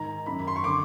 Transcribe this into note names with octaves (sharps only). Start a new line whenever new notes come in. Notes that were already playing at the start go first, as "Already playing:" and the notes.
Already playing: G#2 D#3 A#5
F#2 D#3 B5
B5
C6
C#6
D3 D6